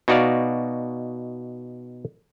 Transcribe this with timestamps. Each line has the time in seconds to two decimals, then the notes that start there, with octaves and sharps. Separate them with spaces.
0.08 B2 D#4 F#4 D5 F5